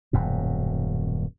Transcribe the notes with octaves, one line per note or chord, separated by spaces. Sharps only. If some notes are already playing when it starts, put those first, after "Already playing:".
D#1 F#2 B2